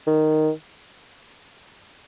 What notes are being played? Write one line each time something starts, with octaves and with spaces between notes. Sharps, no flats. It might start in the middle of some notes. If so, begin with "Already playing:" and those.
D#3